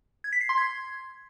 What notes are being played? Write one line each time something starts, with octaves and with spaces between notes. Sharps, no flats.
G#6
B6
C7
C6
G#6